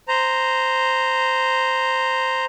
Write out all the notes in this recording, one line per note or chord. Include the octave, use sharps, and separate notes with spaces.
C5 A#5